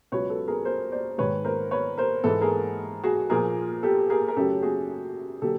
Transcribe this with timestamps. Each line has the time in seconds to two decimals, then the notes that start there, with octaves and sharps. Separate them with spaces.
0.12 C#2 B2 F#3 B4 C#5
0.30 A4 B4
0.48 G#4 A#4
0.65 A#4 C5
0.92 C5 D5
1.18 G#2 D#3 G#3 B4 C#5
1.45 A#4 C5
1.71 B4 C#5
1.98 A#4 C5
2.24 G#2 E3 G#3 A4 B4
2.41 G#4 A#4
3.04 F#4 G#4
3.30 A#2 F3 A#3 G#4 A#4
3.83 G4 A4
4.10 G#4 A#4
4.28 A#4
4.36 F#2 C#3 F#3 A3 G4 A4
4.62 F#4 G#4
5.42 D3 F#3 A#3 G4 A4